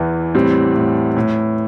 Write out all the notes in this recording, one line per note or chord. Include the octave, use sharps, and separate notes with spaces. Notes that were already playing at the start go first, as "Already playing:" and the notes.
Already playing: E2 E3
A2 G3 C4
A2
A2